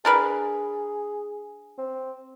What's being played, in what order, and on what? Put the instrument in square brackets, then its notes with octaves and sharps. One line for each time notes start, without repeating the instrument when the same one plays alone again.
[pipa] D4 A#4 B4 [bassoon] G#4
[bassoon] C4